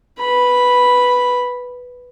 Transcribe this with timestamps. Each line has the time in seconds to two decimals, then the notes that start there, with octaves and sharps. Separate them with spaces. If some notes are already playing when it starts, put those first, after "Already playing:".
0.19 B4 B5